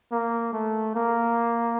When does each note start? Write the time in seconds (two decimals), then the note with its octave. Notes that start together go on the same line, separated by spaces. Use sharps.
0.12 A#3
0.53 A3
0.95 A#3